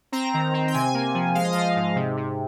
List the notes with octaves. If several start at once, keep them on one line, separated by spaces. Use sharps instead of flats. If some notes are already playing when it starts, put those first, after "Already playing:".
C4 A#5
D#3
C4
G5
C3 G#5
A#3
F3
G#3 F5
D#5
F3 F5
G#2
C3
C3